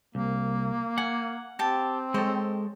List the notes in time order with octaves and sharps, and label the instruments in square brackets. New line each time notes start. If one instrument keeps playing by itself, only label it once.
[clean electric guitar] C2 [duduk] A#3
[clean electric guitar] F#5 [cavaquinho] G#5
[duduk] C4 [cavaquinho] G4 A5
[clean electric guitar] G#3 A4 [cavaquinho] C5 C#5 D#5